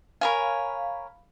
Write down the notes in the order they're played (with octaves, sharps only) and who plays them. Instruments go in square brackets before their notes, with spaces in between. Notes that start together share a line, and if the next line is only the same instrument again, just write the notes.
[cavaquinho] A#4 C#5 G#5 [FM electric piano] F5 B5